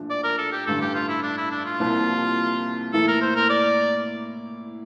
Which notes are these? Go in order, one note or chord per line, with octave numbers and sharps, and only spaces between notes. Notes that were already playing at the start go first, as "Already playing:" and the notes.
Already playing: A#1 A2 F3 A3 D4
D5
A#4
A4
G4
A1 G2 D3 A4
G4
F4
E4
D4
E4
D4
F4
C2 C3 F3 A#3 E4
A2 E3 A#3 E4 A4
A#4
C5
A#4
D5